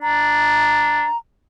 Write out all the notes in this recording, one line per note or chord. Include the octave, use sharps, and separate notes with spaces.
D4 A#5